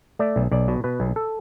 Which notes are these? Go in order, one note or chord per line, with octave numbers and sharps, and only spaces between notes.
A3 D5
B1
B1 D5
B2
B2 B4
B1
A4